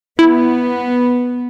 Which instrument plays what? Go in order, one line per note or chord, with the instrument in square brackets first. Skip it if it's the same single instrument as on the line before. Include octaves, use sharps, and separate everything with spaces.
[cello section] B3 [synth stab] E4